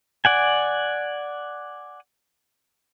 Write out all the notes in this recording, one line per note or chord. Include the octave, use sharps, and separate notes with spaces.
D5 F#5 G#5